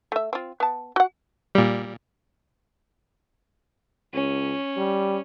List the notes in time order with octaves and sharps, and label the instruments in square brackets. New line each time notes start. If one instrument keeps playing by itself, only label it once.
[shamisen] A3 E5
C4 F4
B3 A5
F#4 F#5
[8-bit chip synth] A#2 G3
[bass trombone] C#2 [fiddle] C#4
[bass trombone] G3